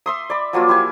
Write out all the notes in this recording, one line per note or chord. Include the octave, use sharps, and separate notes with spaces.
E5 C6 D#6
D5 B5
F3 F#3 A#3 F4
E4 G4 G#5